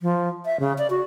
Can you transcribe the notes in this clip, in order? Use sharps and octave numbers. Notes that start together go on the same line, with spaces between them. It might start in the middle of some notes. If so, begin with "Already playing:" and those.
F3
E5
C#3
D5
F#4